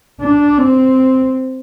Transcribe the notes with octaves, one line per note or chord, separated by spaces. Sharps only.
D4
C4